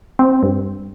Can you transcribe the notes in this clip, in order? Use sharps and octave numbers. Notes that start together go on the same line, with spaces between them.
C4
G2